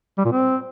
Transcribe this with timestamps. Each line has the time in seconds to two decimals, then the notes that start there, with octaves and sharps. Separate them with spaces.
0.18 G3
0.25 A#2
0.32 C4